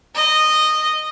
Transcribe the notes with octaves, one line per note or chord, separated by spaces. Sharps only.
D#5